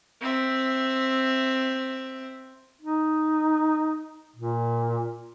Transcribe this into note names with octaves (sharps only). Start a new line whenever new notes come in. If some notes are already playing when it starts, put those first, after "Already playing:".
C4 E5
D#4
A#2